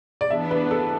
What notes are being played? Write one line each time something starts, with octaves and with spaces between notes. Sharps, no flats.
D5
E3 B3 D4 E5
B4
A4